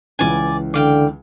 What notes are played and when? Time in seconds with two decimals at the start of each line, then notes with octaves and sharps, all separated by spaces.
0.19 C#2 E3 C#4 D5 G#5
0.74 D3 D5 F5 G5